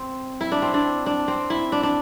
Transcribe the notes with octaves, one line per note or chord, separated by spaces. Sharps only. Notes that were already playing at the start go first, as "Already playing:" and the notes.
Already playing: C4
E4
D4
C4
D4
D4
C4
E4
D4
D4